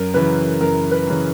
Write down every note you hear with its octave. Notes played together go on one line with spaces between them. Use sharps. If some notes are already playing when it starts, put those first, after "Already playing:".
Already playing: F#2 A#4
C#3 E3 B4
F#2 A#4
B4
C#3 E3